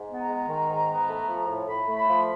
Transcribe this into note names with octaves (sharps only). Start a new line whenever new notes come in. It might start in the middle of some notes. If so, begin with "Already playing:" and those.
Already playing: G#2
B3
A#5
G#3
D#3
G#2
B3
A3
F3
A2
A2 B5
A3
B5
F3